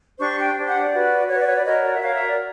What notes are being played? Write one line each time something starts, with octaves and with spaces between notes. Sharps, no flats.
D4 G4 C5 C#6
G5
D4 G4 C5
F#5
D5
F#4 B4
F#4 B4 C#5
D5
C#5
D5
F#4 A#4 C#5 D#5
D5
E5
F#4 A#4 C#5 F5
E5
D5